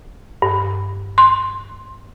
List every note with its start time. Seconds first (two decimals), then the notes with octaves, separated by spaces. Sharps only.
0.42 G2
1.18 C6